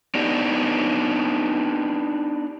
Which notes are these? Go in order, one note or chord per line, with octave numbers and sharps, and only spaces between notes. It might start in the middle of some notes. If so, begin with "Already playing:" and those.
B3 D4 D#4 G4